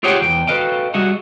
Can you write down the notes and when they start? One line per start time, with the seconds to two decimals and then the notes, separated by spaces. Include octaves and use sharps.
0.03 F4 G4 G#4 C#5 F#5 G5
0.21 E2 G5
0.47 F#4 A4 B4 D#5 F5 G5
0.94 G3 F#4 G#4 D#5 E5 F#5